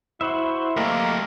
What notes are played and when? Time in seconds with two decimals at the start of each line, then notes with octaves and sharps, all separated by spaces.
0.21 E4 F#4 C5 E5
0.77 A3 A#3 G4 A4 A#4 D#5